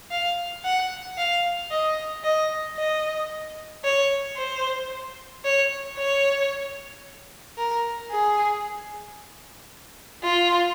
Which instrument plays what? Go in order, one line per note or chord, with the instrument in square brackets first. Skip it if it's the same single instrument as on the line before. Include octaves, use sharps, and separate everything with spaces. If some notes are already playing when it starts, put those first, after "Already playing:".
[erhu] F5
F#5
F5
D#5
D#5
D#5
C#5
C5
C#5
C#5
A#4
G#4
F4